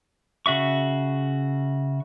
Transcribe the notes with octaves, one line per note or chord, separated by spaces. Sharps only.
C#3 F#4 E5 C#6